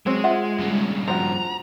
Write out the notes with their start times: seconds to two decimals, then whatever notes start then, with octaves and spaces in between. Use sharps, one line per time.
0.06 F#3 G#3 C4
0.24 F4 E5 F#5
0.60 G2 C#3
1.08 F3 F#4 A#5